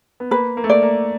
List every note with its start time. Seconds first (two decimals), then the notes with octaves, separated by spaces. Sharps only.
0.20 B3
0.31 A#3 B4
0.57 A#3
0.64 A3
0.70 A#3 D5
0.83 A#3